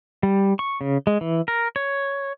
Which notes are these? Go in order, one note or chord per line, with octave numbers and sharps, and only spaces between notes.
G3
C#6
C#3
G#3
E3
A#4
C#5